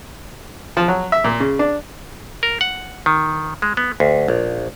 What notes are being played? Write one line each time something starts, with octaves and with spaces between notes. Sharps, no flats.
F3
F#3
E5
A#2
C#3
D4
A#4
F#5
D#3
G#3
B3
D2
A#1